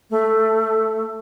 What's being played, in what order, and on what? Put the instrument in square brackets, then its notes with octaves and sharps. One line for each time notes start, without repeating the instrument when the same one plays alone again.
[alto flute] A3